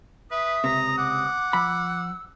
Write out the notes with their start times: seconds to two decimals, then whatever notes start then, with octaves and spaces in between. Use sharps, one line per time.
0.31 B4 E5 D#6
0.64 C#2 C3 A#5
0.98 F#5 D6
1.53 F3 B5 E6